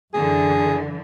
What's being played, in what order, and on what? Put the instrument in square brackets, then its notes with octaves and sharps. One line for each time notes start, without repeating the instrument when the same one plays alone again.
[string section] F#2 D3 E3 [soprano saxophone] G#4